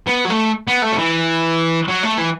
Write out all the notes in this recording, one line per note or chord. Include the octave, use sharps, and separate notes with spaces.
B3
F#3
A3
B3
A3
F#3
E3
F#3
A3
E3